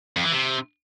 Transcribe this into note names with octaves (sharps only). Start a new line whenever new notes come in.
F2
E3
C3